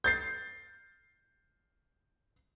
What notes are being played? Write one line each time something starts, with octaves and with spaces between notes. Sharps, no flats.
G6 A6 C7